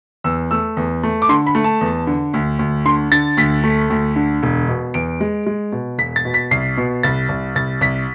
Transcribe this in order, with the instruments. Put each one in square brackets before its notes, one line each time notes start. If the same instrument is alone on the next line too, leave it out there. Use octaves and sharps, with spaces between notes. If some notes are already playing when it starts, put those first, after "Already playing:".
[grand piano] E2 E6
A3 E6
E2
A3
D6
D3 C6
B5
A3
A5
E2
D3
D2
D2
D3 C6
D3 A6
D2 B6
A3
D2
D3
E1
B2
E2 D7
G#3
G#3
B2
E1 B6
A6
B2
B6
C2 C7
B2
C2 A6
C2
C2 A6
C2 B6